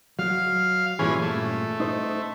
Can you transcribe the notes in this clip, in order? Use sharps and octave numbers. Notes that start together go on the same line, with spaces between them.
F#3 F5
G2 A#2 E3 C#4 G#4
A3
D#4 C5